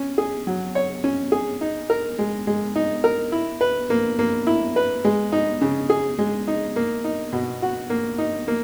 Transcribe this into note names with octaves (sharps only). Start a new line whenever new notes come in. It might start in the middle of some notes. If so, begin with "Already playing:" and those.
Already playing: C#4
G#4
F#3
C#5
C#4
G#4
D#4
A#4
G#3
G#3
D#4
A#4
E4
B4
A#3
A#3
E4
B4
G#3
D#4
C#3
G#4
G#3
D#4
A#3
D#4
B2
F#4
A#3
D#4
A#3